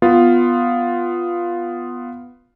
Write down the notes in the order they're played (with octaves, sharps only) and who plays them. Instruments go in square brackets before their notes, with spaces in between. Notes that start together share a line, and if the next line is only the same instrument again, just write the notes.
[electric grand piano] B3 F4